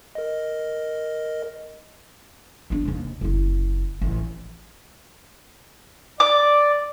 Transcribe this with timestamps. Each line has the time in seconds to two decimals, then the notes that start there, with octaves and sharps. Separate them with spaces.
0.15 A#4 D#5
2.70 B3 D4
2.85 D#2 C3
3.21 F#1 E4
4.01 A1 F3
6.20 D5 D6